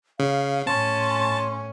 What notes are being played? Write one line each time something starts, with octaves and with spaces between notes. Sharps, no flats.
C#3 F5
A2 C#4 A5 C6